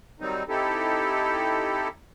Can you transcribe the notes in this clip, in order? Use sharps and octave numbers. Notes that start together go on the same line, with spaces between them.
D#3 F#3 G3 C4 D#4
C4 D#4 E4 G4 A4